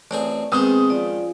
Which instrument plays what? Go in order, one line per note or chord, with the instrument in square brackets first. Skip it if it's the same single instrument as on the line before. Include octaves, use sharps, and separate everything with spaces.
[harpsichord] A1 C4 G#4 [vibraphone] D5
[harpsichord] D#3 G#3 C5 [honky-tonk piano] B3 D#6 [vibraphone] C4 [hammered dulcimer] G#4
[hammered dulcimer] F3 C#4 F5 [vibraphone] D5